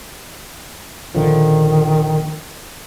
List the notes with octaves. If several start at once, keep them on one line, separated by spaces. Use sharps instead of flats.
A#1 D3 D#3 F3